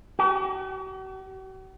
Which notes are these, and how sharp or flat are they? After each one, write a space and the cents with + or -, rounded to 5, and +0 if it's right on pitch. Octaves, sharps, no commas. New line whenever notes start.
F#4 +45